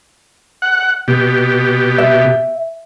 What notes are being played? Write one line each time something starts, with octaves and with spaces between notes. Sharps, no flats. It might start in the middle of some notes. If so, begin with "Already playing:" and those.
F#5
B2 G4
E5